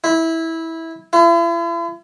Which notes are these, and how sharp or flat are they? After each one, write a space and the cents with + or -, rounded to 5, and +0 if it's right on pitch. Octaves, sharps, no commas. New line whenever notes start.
E4 -15
E4 +45